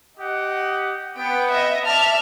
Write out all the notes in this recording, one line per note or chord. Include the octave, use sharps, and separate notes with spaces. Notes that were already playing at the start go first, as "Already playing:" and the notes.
G4 D#5 F#5
B3 G5
D#5 E5
D5 E5 A5 F6